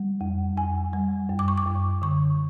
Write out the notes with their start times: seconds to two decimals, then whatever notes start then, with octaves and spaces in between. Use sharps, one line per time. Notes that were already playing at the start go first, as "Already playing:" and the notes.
Already playing: G3
0.21 F2
0.57 F2 G#5
0.93 G3
1.29 F#2
1.39 D6
1.48 C#6
1.58 D6
1.66 F#2
2.02 D3 C#6